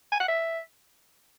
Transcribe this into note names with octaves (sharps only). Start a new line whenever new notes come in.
G#5
F#5
E5